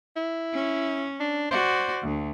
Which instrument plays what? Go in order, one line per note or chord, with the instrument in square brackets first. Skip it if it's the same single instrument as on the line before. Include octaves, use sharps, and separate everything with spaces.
[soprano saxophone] E4
[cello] C#4
[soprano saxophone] D4
[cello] F#4 D5 [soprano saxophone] C5
[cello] D2